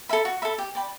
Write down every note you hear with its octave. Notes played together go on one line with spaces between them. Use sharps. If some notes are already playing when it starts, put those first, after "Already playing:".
A4 E5 B5
F#4
A4 E5 B5
G4
D5 G5 B5